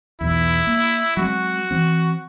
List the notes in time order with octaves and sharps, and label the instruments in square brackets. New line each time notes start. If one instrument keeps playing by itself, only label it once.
[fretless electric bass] B1 E2 [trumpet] E4
[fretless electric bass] A#3
[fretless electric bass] F#3 G#3 C4 [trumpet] F#4
[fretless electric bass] E3 C4